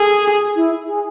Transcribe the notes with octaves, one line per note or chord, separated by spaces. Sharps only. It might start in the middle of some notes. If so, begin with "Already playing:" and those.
Already playing: G#4 A4
E4
G#4